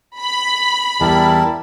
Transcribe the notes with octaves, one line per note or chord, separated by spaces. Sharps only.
B5
E2 G3 E4 A#4 A5